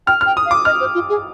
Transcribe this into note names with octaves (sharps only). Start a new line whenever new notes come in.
G5 F6
F6
G5
D#6
F5
D6
D#5 F6
C5
F4
G#4